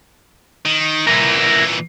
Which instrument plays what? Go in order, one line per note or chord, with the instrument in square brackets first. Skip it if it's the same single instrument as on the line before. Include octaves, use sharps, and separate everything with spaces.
[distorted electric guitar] D#3
[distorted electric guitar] A#2 E3 [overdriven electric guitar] E4 A#4